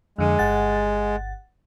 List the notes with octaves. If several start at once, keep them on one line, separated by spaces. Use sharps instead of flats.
F2 D3 G#3
G1 F#5 A6